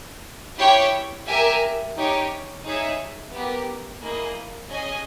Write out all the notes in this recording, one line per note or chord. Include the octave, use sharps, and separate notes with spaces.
E4 G4 C#5 G5
G4 A#4 E5 G#5
D#4 G4 C#5 G#5
D#4 G#4 C#5 E5
B3 G4 A#4
A#3 E4 G#4 D#5
C#4 G#4 D#5 G#5